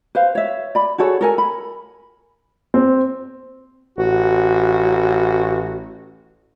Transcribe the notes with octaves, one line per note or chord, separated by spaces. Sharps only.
B4 C5 F5
C#5 E5
D5 B5
F#4 G#4 A4 C#5
A4 A#4 G#5
B5
C4
A1 F#4